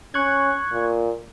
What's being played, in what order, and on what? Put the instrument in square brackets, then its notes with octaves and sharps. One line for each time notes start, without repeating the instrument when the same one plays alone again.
[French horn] C#4 [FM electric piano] C#6 F#6 G#6
[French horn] A#2